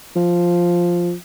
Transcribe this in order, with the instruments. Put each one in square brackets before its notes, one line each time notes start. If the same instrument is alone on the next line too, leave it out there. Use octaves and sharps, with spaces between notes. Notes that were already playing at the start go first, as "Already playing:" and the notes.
[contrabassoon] F3